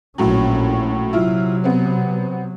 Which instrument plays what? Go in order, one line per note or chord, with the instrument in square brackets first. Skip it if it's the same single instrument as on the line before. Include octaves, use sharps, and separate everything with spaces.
[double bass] A#1 C#4 [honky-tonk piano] A2 F#3
[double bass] C3 F#3 [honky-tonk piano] E4 F4
[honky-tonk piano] B3 C4